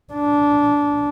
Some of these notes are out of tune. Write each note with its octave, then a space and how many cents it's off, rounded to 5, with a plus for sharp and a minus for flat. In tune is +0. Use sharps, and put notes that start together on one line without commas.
D4 -15